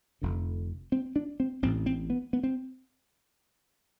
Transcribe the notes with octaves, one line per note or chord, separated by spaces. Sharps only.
F1 F2 D3
C4
D4
C4
A1 A2 C4
C4
B3
B3
C4